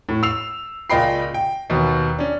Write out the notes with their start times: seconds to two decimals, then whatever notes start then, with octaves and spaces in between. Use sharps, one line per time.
0.09 A2
0.23 E6 C7 F7
0.90 C#2 A#2 D#5 G5 B5 C7
1.34 G5
1.70 D#2 B2
2.19 C#4 D4